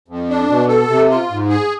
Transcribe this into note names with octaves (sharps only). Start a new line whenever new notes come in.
F2
D4
B2
A4
C3
F4
G#2
G#4